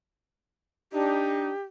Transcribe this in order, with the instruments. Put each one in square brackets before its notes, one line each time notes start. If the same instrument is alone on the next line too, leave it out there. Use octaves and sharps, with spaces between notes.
[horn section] D4 D#4 [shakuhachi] G4